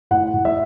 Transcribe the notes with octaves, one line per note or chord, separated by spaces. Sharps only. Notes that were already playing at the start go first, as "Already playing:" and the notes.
A2 F#5
A2
E5